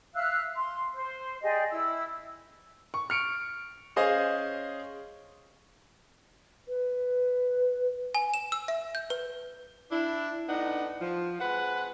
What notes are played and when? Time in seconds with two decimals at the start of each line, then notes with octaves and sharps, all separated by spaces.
0.15 E5 F5 E6 F#6
0.56 C6
0.92 C5
1.42 G4 G#4 D5 D#5
1.71 E4 E6
2.94 C#6
3.10 F6 C#7 D7
3.96 C#4 G#4 C5 D#5 F5 G#5
6.68 B4
8.15 G#5
8.34 E7
8.52 E6
8.68 E5
8.95 G6
9.10 B4
9.92 D4 E4
10.48 A2 B3 D4 D#4 F#5
11.00 F3
11.40 G#3 C4 B4 F#5